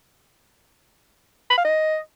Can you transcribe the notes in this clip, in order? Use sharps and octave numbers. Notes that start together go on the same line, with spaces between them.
B5
F5
D#5